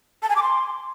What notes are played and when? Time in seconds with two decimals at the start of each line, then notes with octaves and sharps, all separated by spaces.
0.23 A5
0.29 G#5
0.36 D6
0.43 C6